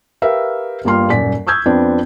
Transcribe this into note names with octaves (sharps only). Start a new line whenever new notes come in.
G4 A#4 B4 E5 F5
G1 G3 A#3 F4 C6 F6
D#1 F#2 D5 B6
C#6 D#6 E6 G6 G#6
F2 F3 B3 C4 D4